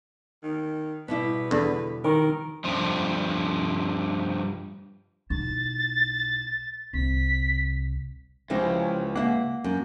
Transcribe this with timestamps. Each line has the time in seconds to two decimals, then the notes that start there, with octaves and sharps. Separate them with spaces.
0.44 D#3
1.08 B2 G3 E4 B4
1.51 E2 D3
2.04 D#3 A#4
2.65 G2 F3
5.30 B1 E4 A6
6.93 C2 C3 B6
8.50 C#2 F3 E4 G4
9.15 A#3 E5 F#5
9.64 F#2